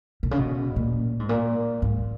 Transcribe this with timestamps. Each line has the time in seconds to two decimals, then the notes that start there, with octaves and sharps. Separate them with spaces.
0.23 B2
0.31 C#3
0.38 B2
0.76 A#2
1.20 G#2
1.29 A#2
1.82 G#2